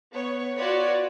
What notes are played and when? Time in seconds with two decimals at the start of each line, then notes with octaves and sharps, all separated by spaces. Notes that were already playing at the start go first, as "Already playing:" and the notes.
0.12 B3 C#5
0.57 F4 F#4 B4 C#5 D5